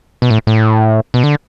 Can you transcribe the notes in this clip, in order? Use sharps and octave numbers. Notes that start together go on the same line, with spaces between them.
B2
A2
A2
B2
D3